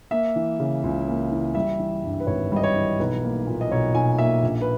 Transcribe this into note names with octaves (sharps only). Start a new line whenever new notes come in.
A#3 E5
E3
C#3
C#2
A#3
E3
G3 E5
E3
G2
B4
G#1 C#5
G3 D#5
C#5
E3
B1 B4
A#3
A#2
D#5
B1 C#5
B1 G#5
A#3 E5
A#1
B4